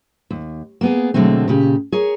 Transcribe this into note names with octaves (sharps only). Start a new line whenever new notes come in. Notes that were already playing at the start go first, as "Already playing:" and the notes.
D#2
A#3 B3 G#4
B2 D3 F#3 G#3 A3 C4
A#2 C#3 G4
G#4 A#4 C#5